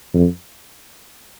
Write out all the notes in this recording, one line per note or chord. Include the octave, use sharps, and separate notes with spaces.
F2